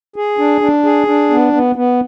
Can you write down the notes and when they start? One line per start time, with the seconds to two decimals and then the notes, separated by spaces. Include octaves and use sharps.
0.16 G#4
0.38 D4
0.61 D4
0.84 G#4
1.07 D4
1.30 B3
1.53 B3
1.76 B3